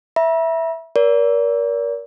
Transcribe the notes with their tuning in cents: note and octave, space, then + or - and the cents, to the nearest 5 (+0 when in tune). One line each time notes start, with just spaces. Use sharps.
E5 +0 B5 -45
A#4 +25 D5 -40